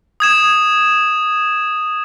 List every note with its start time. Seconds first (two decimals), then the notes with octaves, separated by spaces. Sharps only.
0.20 D#6 G#6 E7